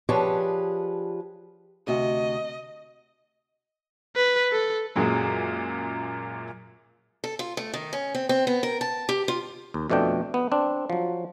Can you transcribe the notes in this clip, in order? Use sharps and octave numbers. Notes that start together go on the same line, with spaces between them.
F3 D4 G4 G#4 B4 C#5
D2 C3 F#4 D#5
B4
A4
F#2 A#2 F#3 G#3
A4
F4
A3
D#3
C#4
C4
C4
B3
A#4
A5
G4
F4
D#2
F2 B2 A3 D4 G5
B3
C4 D4
F3 F#3